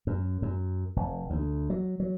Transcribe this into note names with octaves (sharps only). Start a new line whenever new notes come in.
F#2
F#2
F1
D2
F#3
F#3